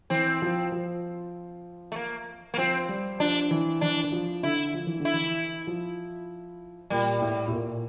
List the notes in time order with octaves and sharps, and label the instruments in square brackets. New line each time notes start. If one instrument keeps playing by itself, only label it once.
[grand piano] E3 [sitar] C4
[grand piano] F3
F3
[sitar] A3
A#3
A#3
[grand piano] F3 [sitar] C4
[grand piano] G3
[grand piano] F3 [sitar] D4
[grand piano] E3
[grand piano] E3 [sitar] D4
[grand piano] E3
F3
[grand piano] D3 [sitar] E4
[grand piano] F3
E3
D3
[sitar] E4
[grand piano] E3
F3
[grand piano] A#2 [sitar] G3
[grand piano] A2
A2
A#2